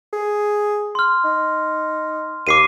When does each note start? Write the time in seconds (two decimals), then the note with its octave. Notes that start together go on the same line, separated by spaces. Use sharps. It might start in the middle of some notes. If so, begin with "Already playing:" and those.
0.13 G#4
0.95 C6 F6
1.25 D#4
2.47 D#2 D6 C7 D#7